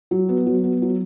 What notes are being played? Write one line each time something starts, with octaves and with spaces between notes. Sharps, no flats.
F#3
B3
F#3
B3
F#3